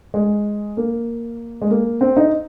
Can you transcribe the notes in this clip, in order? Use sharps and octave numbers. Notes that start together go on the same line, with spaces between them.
G#3
A#3
G#3
A#3
C4
D#4